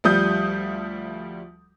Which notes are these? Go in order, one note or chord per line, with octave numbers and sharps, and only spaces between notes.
D2 F3 G3 D#6 G6